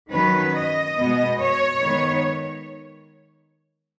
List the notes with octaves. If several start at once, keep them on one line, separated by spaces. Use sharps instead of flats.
D#3 F#3 C#4 B4
D#5
B2 G#3 B3
C#5
D#3 G#3 B3